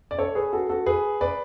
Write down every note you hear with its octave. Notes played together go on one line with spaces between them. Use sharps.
D5
A4 C#5
G#4 B4
F#4 A4
F#4 A4
G#4 B4
B4 D5